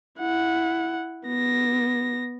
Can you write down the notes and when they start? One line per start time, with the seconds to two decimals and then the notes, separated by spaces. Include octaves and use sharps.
0.20 E4 F#5
1.27 B3 A#6